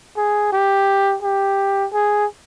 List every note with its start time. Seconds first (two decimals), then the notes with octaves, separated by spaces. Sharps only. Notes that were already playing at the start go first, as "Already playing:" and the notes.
0.17 G#4
0.53 G4
1.22 G4
1.93 G#4